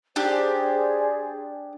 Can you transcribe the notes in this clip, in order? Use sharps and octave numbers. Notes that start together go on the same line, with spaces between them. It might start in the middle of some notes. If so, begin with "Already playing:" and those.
D4 G4 G#4 C5 D5